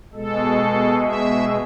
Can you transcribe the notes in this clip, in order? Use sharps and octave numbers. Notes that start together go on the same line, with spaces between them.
B2 G#3 A4
E5